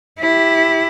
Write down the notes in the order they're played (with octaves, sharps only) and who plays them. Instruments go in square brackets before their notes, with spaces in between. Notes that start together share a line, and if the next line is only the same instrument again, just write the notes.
[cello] E4 G4